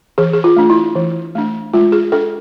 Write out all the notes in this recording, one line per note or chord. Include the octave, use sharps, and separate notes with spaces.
E3 G#4
G#4
F4
A3 D4
E4
E3
A3 D4
G#3 F4
G#4
D4 A4